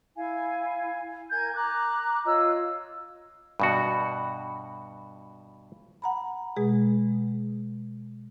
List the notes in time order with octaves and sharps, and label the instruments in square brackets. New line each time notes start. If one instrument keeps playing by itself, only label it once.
[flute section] E4 F5 G#5
A#4 G#5 G6 G#6
A#5 D6 F#6
F4 C#5 D#5 E6
[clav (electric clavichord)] G2 B2 F#4
[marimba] F#5 A#5 B5
B2 G#3 G#4